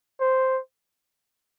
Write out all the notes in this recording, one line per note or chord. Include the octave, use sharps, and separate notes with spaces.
C5